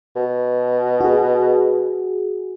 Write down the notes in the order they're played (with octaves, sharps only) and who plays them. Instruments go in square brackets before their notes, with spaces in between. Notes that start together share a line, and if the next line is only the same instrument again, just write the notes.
[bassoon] B2
[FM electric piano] F#4 G#4